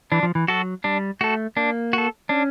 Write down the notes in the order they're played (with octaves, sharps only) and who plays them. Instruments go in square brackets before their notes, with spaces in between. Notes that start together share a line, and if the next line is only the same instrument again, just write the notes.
[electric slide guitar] E3 [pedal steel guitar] D4
[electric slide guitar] F3
E3
[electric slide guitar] F#3 [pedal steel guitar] F#4 A4
[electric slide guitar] G3 [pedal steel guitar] D4
[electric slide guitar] A3 [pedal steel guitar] F#4 A4
[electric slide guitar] A#3 [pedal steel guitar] D4
[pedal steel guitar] F#4 A4
[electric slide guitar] C#4 [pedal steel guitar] D4